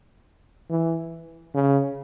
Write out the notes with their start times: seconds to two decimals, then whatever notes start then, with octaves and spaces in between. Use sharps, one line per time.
0.70 E3
1.55 C#3